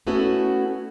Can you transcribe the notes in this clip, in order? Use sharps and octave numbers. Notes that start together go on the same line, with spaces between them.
A3 B3 C#4 E4 F#4 A4